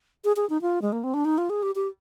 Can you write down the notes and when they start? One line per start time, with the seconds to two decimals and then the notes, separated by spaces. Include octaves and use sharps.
0.24 G#4
0.36 G#4
0.50 D#4
0.62 F4
0.82 G#3
0.92 A#3
1.04 C4
1.14 D4
1.25 D#4
1.38 F4
1.50 G#4
1.63 G4
1.75 G4